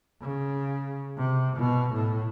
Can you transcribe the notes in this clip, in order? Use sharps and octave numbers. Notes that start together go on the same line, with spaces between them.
C#3
C3
B2
A2